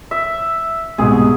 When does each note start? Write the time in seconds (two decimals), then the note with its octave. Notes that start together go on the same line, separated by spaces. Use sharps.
0.11 E5
0.98 C2 G#2 B2 G#4